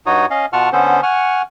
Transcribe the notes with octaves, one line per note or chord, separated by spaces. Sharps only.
G2 D#4 F#4 C#5 D#6
C#4 D#5 F5
B2 F4 F#5 A5 C#6 F6
D3 B3 C#4 A4 C5
F#5 G#5 C#6 F6